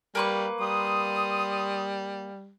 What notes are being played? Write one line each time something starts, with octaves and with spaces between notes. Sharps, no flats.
G3 A#3 B4 C#6
G3 C6 D#6